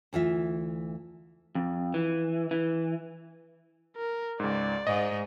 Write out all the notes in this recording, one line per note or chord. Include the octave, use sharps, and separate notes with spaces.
D2 E3 F4 E5
F2
E3
E3
A#4
C#2 G#2 D5
G#2 D#5